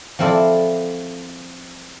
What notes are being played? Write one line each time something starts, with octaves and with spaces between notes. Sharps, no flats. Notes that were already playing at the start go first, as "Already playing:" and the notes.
F3 C4 E4 A4 D5